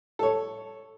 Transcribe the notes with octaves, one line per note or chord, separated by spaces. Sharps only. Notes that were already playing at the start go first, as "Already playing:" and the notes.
A4 C#5